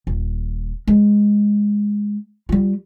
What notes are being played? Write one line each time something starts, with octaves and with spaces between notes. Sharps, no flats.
D#1
G#3
G3 F4